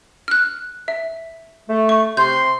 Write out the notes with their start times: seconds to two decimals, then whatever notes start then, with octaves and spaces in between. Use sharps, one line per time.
0.28 F6 F#6
0.88 E5
1.69 A3
1.89 C#6
2.17 C3 C6 G6